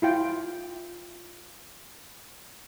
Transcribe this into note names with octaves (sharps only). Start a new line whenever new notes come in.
E4 F4 G5